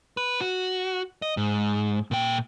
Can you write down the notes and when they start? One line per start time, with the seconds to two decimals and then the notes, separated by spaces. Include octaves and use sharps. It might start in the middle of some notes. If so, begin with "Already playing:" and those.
0.17 B4
0.41 F#4
1.22 D#5
1.37 G#2
2.11 A#2 G5